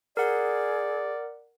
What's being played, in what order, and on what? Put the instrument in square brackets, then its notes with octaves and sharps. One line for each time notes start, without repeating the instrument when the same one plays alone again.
[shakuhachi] G#4 [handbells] A#4 F#5 [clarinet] D5